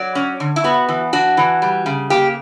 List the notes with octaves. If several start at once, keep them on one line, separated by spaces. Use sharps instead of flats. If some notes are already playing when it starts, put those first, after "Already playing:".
Already playing: F#3 D5
C#4
D3
E4
B3 F#4
E3
D4 F#4
E3
G3
C#3
A#3 G4